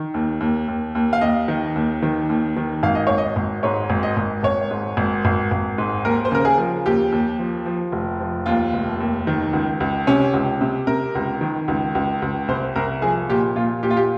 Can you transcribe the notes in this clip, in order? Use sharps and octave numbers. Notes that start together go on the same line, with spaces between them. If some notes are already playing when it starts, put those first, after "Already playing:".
Already playing: D#3
D#2
D#2
D#2
D#2
F5
D#2 D#5
D#3
D#2
D#3
D#2
D#3
G#1 F5
D#5
G#1 C#5
D#5
G#1
G#2 C#5
G#1
D#5
G#1
G#1 C#5
G#2
G#1
G#1
G#1
G#2
D#2 A#4
C5
C#3 A#4
G#4
F3
D#2 G4
D#2
F3
F3
F1
F3
D#2 F4
F1
D#2
D#3
C#2
C#2
C3 C#4
C#2
C3
C3 A#4
C#2
D#3
C#2
C#2
C#2
C2 C5
C2 A#4
F3 G#4
A#2 G4
A#2 F4
A#2 G4
F4
G4